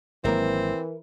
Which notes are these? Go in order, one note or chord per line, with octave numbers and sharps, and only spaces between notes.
G#1 E3 F#3 A#3 C4 E4 A#4